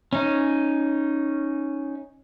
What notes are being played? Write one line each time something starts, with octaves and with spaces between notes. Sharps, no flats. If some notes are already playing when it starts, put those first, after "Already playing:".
C#4 D#4